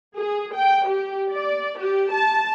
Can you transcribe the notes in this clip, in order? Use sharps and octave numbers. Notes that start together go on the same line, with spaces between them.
G#4
G5
G4
D5
G4
A5